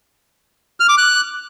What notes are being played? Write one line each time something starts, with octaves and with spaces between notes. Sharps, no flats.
F6
D6
F#6